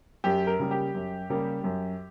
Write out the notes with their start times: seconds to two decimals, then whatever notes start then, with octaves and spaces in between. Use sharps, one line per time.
0.24 F#2 G4
0.47 A#4
0.59 C#3 G3 A#3
0.71 G4
0.95 F#2
1.30 C#3 G3 A#3
1.64 F#2